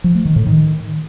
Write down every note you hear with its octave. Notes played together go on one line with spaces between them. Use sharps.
F3
A3
D#3
A2
D#3